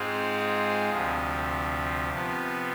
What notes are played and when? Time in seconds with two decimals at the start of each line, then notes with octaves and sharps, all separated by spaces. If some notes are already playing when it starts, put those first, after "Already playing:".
Already playing: G#2 G#3 C4 F4 G#4
0.89 D2 C3 F3
2.13 C3 F3 B3